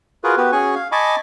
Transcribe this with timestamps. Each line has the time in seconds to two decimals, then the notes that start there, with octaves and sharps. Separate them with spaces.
0.24 F4 F#4 G#4 A#4 B4
0.37 B3 F#4 G4 B4
0.52 C#4 F#4 G#4 G#5 C#6
0.75 F5
0.92 D#5 G#5 A5 B5 C#6 D6